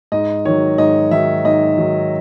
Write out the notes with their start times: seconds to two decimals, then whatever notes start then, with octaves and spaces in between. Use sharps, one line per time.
0.12 G#2 D#5
0.45 D#3 F#3 C#5
0.78 G#2 D#5
1.11 D#3 F#3 E5
1.45 G#2 D#5
1.78 D#3 F#3